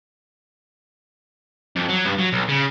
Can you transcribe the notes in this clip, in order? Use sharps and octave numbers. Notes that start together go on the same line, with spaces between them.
F2
F#3
G2
F#3
B1
C#3